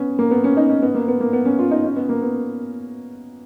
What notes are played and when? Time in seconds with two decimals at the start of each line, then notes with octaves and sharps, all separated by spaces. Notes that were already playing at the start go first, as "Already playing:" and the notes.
Already playing: B3 C#4
0.19 A#3
0.31 B3
0.44 C#4
0.57 D#4
0.69 C#4
0.82 B3
0.94 A#3
1.08 B3
1.20 A#3
1.33 B3
1.45 C#4
1.59 F4
1.71 D#4
1.84 C#4
1.96 B3
2.09 A#3
2.22 B3